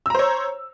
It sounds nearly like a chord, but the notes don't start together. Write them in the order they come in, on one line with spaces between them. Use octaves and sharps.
E6 A#5 C5 C#5